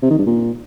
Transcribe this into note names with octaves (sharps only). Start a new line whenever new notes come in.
C3
D#3
G2
A#2